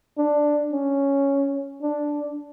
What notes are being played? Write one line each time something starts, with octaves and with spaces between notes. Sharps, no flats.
D4
C#4
D4